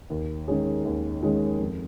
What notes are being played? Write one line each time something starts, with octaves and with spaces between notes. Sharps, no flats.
D#2
D#3 G#3 C#4 G#4
D#2
D#3 G#3 C#4 G#4
F2